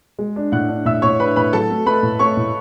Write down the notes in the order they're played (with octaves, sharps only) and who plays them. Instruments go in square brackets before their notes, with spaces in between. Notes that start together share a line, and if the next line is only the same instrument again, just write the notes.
[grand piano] G#3
D4
[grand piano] A2 [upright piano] F#5 F#6
[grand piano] D4
[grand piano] A2 [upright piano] E5 E6
[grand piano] A2 [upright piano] C#5 C#6
[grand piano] D4 [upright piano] B4 B5
[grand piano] A2 [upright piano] B4 B5
[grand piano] F#3 [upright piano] A4 A5
[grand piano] A3
[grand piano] A3 [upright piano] B4 B5
[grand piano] A2
[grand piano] A3 [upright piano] C#5 C#6
[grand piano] A2